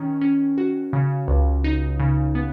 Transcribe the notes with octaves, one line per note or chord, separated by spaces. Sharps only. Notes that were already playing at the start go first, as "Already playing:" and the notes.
Already playing: D#3 C#4
C#4
F#4
C#3
C#2
D#4
C#3
B3